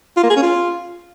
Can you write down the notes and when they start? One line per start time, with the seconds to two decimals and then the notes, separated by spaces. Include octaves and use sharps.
0.17 F4
0.23 A#3
0.30 G#4
0.36 C#4
0.43 F4